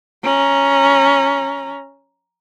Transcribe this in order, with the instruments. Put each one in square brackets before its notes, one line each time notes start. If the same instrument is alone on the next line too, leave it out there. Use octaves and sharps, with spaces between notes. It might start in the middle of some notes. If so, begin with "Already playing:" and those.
[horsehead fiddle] C#4 A#5